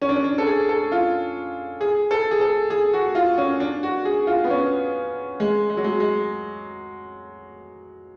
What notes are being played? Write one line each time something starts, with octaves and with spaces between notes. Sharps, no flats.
C#4
D4
C#4
D4
A4
G#4
A4
F4
G#4
A4
G#4
A4
G#4
F#4
F4
C#4
D4
F#4
G#4
F4
B3
C#4
G#3
G#3
F#3
G#3
G#3